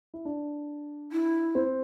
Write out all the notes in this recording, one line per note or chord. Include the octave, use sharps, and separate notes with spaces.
E4
D4
E4
C4